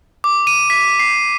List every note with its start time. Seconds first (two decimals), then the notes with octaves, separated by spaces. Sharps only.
0.24 D6
0.47 D#7
0.70 B6
1.00 C7